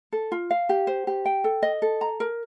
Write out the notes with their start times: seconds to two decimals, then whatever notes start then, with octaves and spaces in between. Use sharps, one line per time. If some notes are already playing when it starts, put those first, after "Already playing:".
0.13 A4
0.32 F4
0.51 F5
0.69 G4
0.87 C5
1.07 G4
1.26 G5
1.44 A4
1.63 D#5
1.82 A4
2.01 A#5
2.20 A#4